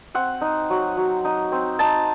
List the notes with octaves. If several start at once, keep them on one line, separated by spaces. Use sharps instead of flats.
C4 F#5
D#4
F#3
F#3
D#4
C4
D#4 A5